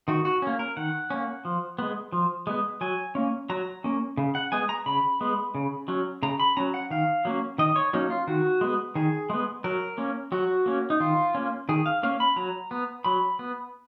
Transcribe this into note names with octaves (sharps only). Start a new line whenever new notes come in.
D#3 F#4
F#4
A#3 C#4
A#4
D#3 F#5
A#3 C#4
F3
G#3 B3
F3
G#3 B3
F#3 G#5
A#3 C#4
F#3 A#5
A#3 C#4
C#3
F#5
G#3 B3 G#5
A#5
C#3 B5
G#3 B3
C#3
F#3 C#4
C#3 A#5
B5
F#3 C#4 A#5
F#5
D#3 F5
F#3 A#3 C#4
D#3 D#5
C#5
F#3 A#3 C#4 D#4
F4
D#3 F#4
G#3 B3
D#3 G#4
G#3 B3
F#3 A#4
A#3 C#4
F#3 F#4
A#3 C#4
D#4
D#3 F4
A#3 C#4
D#3 G#4
F5
A#3 C#4 F5
B5
F#3 A#5
B3
F#3 B5
B3